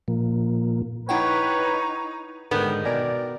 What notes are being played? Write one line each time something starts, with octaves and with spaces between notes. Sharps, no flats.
A#2 F3 A#3
D#4 E4 B4 C#5 F#5 G5
G#2 D3 D#3 B3
B2 A#4 D5 G#5